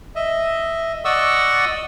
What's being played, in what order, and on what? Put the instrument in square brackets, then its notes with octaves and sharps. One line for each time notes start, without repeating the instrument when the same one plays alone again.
[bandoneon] D#5 E5
D5 D#5 F#5 C#6 D#6 E6